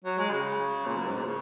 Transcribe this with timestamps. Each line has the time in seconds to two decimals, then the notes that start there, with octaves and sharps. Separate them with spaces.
0.04 F#3
0.19 G#3
0.31 C#3
0.86 A#2
0.96 F#2
1.07 G#2
1.17 A#2
1.26 C#3